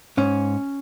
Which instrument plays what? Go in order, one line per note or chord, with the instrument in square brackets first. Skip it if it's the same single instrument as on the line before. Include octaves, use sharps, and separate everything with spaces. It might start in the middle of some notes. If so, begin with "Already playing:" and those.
[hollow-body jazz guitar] G#2 C#4